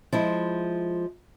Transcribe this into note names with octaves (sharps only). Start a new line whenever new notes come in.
F3 G#3 E4